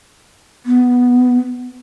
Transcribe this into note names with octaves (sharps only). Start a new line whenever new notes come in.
B3